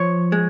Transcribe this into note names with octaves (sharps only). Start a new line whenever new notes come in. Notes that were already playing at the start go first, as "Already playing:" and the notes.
Already playing: F3 C#5
G#3